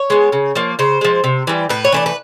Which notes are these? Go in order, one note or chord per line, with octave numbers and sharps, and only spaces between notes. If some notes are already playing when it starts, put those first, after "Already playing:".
Already playing: C#5
G#3 B3
C#3
F3 A#3
C#3 C5
F3 G#3
C3
E3 G3
A2 B4
C#5
E3 A3 D4 C5
B4